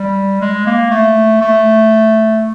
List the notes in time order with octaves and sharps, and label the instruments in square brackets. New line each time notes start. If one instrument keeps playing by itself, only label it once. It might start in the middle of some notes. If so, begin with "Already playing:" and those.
Already playing: [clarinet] G3
G#3
A#3
A3
A3